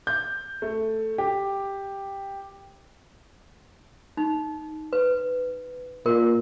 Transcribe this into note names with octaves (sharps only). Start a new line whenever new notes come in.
G6
A3
G4
D#4
B4
A#2 A#4